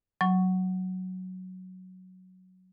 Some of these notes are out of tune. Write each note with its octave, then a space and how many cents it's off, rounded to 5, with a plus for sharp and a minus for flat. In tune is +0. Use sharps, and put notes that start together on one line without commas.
F#3 +0 C#6 +0